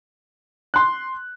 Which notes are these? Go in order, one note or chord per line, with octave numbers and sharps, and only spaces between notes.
C6 F#6